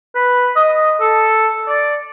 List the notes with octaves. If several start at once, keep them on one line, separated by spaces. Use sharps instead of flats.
B4
D#5
A4
D5